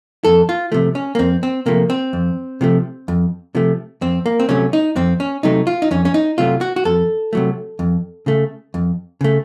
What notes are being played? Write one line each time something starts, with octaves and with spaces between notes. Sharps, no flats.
F2 A4
F4
C3 F3 A3
C#4
A#3
F2 C4
C4
C3 F3 A3 A#3
C4
F2
C3 F3 A3
F2
C3 F3 A3
F2 C4
A#3
C4
C3 F#3 A3 C#4
D#4
F2 C4
C#4
C3 F#3 A3 D#4
F4
D#4
F2 C#4
C#4
D#4
C3 F#3 A3 F4
F#4
F#4
F2 A4
C3 F#3 A3
F2
C#3 A3
F2
C#3 A3